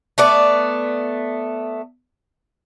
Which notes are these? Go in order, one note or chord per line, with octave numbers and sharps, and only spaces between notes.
A3 B3 D5